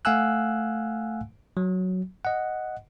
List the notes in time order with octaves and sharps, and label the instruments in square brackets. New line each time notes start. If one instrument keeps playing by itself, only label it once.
[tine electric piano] A3 F5 F#5 G#5 E6 F#6
F#3
D#5 F#5